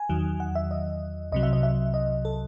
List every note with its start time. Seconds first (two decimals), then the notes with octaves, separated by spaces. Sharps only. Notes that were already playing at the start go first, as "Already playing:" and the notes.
Already playing: G#5
0.09 E2 D#3 F#3
0.40 F#5
0.55 E5
0.71 D#5
1.32 C2 C3 F#3 D#5
1.43 E5
1.53 D#5
1.63 E5
1.94 D#5
2.25 A4